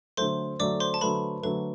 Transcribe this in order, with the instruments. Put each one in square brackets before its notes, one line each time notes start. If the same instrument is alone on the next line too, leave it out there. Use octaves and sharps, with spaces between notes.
[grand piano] D3 F#3 A3 [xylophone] C5 C6
[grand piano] D3 F#3 A3 [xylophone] D5 D6
[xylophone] C5 C6
A5
[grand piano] D3 F#3 A3 [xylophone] B4 B5
[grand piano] D3 F#3 A3 [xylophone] B4